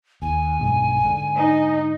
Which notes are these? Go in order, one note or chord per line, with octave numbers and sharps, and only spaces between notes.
D#2 G#5
B1 G2 G#3
G#2 D3
D#4